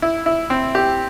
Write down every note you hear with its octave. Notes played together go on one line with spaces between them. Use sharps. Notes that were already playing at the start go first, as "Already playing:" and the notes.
E4
E4
C4
G4